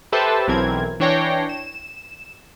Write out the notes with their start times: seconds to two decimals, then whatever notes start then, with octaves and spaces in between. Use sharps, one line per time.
0.12 G4 A4 B4 C5 E5 A5
0.48 B1 E3 C4 A#4 G#6
1.00 E3 D4 C#5 G5 A#6 C7
1.49 E7